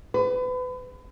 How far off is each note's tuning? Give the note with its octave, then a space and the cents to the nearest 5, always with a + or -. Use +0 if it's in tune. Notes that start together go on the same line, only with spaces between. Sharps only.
B4 +30